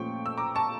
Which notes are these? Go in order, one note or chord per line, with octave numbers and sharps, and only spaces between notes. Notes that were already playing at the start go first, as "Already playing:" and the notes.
Already playing: A#2 F3 A3 C#4 G5 C#6
E6
A#5 D6
A5 C#6